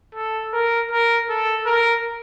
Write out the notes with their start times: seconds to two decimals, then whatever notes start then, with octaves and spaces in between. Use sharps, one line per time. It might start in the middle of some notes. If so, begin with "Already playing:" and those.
0.15 A4
0.53 A#4
0.91 A#4
1.29 A4
1.66 A#4